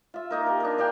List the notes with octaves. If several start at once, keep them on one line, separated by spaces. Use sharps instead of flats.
F4 E5
A#3 D#4 A#4
G4 A#4
D4 G#4 A#4
D4 A#4 F5 G5